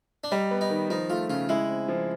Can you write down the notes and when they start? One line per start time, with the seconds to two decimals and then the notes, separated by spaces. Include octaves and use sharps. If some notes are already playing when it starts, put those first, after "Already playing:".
0.24 D4
0.32 G3 D#4
0.51 B3
0.61 D#4
0.70 D#3
0.90 F3 D#4
1.09 A3 F4
1.29 C#3 F4
1.49 G#3 E4
1.68 C4
1.88 F3